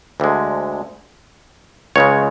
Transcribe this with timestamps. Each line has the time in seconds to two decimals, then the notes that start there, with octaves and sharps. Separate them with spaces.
0.20 D2 D3 G#3
1.96 C#2 C#3 G#3 C#5